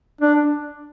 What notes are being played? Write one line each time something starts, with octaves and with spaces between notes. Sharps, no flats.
D4